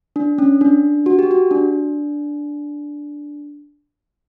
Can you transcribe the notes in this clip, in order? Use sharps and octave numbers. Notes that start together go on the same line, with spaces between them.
D4
C#4
D4
F#4
G4
F#4
D4